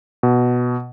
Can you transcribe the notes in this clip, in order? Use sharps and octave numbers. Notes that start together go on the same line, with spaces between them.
B2